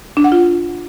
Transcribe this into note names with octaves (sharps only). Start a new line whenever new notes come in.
D4
F#5
F4